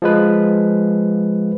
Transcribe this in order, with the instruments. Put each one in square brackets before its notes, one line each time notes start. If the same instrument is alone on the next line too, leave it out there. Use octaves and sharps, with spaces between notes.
[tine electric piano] F3 G#3 B4